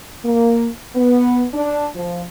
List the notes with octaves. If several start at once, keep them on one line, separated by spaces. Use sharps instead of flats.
A#3
B3
D4
F3